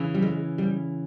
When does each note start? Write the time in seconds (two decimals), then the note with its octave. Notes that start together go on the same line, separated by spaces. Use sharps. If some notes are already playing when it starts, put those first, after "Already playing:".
Already playing: C#3 E3
0.14 G3
0.22 G#3
0.58 G3